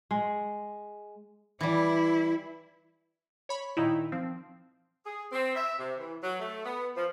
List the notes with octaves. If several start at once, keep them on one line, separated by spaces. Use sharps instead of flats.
G#3
E3 G3 E4
C#5 B5 C#6
A#2 D#3 D#4 E4
F3 C4
G#4
C4
E5
C3
E3
F#3
A3
B3
F3